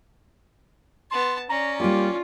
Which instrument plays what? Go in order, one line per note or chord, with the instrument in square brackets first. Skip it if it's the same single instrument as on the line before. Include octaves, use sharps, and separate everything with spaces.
[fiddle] B3 A5 [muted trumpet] C6
[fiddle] C#4 D5 [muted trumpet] A#5
[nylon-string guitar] G3 A#3 [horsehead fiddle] F4 [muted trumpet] G4